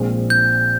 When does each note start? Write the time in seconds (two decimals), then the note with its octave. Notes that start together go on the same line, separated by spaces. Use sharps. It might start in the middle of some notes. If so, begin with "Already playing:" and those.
Already playing: A#1 A#2 G#3 C4
0.30 G6